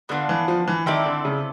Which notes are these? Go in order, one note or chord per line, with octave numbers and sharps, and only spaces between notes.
D3 B3 D4 F4
E3
F3
E3
D#3 C4 E4 A4 D5
D3
C#3